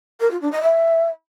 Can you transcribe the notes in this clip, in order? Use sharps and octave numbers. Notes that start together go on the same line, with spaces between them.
A#4
F4
D4
D#5
E5